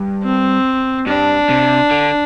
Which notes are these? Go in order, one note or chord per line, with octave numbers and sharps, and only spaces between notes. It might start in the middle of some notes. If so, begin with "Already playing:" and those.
Already playing: G2
C4
G2 D4
C3
D3